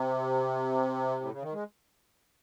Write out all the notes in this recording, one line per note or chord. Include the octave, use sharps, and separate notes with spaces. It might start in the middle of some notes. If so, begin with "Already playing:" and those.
Already playing: C3
A2
C#3
D#3
G#3